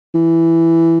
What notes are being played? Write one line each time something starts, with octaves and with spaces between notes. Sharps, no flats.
E3